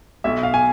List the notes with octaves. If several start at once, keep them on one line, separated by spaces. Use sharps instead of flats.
B1 B2 E5
F5
G#5